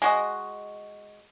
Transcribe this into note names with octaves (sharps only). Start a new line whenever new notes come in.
G#3 F#4 D#5